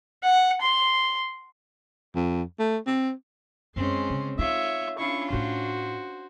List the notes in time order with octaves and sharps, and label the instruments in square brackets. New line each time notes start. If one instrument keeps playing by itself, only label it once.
[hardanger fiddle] F#5
C6
[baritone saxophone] F2
A3
C4
[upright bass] F#2 [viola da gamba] G#3 C4 C#4 [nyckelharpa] C6
[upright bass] C#3
[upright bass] D#4 [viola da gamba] F4 [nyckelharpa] C#5 E5
[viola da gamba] C#4 D4 F4 [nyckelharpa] E4 C#6
[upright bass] A2 E4 [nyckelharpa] F#4 C5